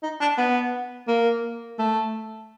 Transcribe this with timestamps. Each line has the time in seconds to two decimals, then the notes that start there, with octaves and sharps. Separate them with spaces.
0.03 D#4
0.21 D4
0.38 B3
1.08 A#3
1.79 A3